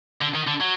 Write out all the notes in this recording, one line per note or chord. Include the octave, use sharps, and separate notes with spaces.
D3
D#3
D3
F#3